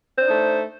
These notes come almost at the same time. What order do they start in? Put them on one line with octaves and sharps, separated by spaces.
C5 D4 D#4 A3